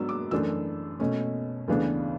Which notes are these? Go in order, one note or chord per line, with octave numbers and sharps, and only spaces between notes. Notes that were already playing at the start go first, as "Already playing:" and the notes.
Already playing: G#2 F#3 B3 D4 E6
D6
F#2 E3 A3 D4 E6
B2 A3 C#4
D2 C#3 E3 B3 D4